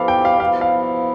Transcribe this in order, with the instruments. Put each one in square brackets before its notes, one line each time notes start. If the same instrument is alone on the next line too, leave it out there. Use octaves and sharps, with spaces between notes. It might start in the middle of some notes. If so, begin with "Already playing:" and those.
Already playing: [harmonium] F3 B3 E4 G4 [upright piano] A4 F5
[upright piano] G5
F5
[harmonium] F3 B3 E4 [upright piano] F5
[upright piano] F5